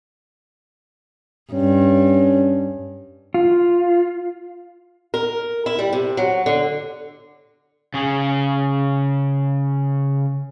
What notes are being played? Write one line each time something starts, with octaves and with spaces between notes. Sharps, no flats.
G2 C#4
F4
A#4
E4
G3
C3
F#3
D3
C#3 G#4